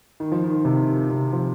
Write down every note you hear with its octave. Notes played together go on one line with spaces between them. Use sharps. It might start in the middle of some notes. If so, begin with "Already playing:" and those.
D#3
F3
D#3
C3
C3
F3